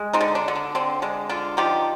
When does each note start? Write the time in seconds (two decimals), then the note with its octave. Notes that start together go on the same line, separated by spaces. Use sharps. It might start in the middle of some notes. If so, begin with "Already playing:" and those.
Already playing: G#3
0.13 C4 D#4
0.21 D3
0.35 D4
0.48 D3
0.55 D4
0.75 D3 C4
1.02 G#3 D4
1.29 D3 D4 F4
1.57 F3 D#4 G4